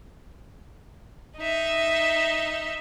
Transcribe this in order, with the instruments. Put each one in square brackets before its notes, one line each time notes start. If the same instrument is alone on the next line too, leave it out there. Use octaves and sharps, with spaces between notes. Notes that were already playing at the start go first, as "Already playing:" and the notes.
[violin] D#4 E5